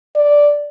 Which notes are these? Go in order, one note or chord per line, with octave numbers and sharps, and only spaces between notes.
D5